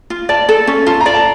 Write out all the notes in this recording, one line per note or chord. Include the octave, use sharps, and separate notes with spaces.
F4
D5 A5
A4
C#4
F4 A5
A#5
D5
A5